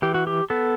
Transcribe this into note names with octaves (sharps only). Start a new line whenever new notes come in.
E3 G4
F#4
G4
B3 A4